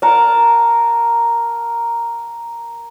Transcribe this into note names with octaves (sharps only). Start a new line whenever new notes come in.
A#4 F#5 A5 A#5